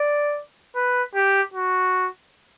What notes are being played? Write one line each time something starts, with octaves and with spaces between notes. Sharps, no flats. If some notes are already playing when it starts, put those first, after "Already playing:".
Already playing: D5
B4
G4
F#4